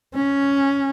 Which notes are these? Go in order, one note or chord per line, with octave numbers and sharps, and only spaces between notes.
C#4